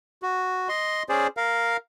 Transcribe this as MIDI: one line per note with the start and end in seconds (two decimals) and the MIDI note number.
0.23 0.68 66
0.69 1.03 75
0.69 1.03 84
1.09 1.27 61
1.09 1.27 68
1.09 1.27 72
1.09 1.27 74
1.37 1.77 70
1.37 1.77 77